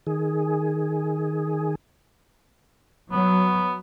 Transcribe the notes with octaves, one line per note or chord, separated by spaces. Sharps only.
D#3 G#4
F#3 B3